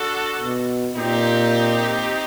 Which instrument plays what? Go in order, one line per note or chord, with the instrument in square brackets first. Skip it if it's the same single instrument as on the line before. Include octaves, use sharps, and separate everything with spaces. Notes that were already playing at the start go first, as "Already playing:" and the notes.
Already playing: [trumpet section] D4 F#4 A4
[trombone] B2
[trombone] A#2 [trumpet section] C4 D#4 G4